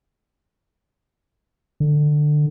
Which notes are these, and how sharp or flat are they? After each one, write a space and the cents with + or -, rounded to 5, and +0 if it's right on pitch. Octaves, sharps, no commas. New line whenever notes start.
D3 +20